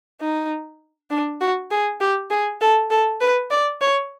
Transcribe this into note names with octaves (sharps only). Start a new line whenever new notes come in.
D#4
D4
F#4
G#4
G4
G#4
A4
A4
B4
D5
C#5